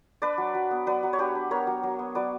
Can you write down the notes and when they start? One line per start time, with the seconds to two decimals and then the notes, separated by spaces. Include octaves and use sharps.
0.22 D4 B4 D5
0.38 F#3
0.55 F#3
0.71 B3
0.87 F#3 B4 D5
1.03 F#3
1.13 C#5
1.18 D4 G4 B4
1.35 D4
1.51 B3 A#4 C#5
1.67 F#3
1.83 F#3
1.99 B3
2.15 F#3 B4 D5